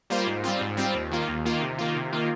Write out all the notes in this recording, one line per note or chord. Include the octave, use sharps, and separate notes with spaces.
G3 A#3 F4 C5
G#2
G3 C4 F4
G#2
G3 C4 F4
D#2
D#3 A#3 F4
D#2
D#3 A#3 F4
C3
D#3 A#3 F4
C3
D#3 A#3 F4